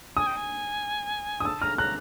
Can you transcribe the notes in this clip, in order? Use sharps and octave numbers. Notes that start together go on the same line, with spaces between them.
G#5 D#6
G5
G#5
D#6
A5 E6
A#5 F6
A#5 F#6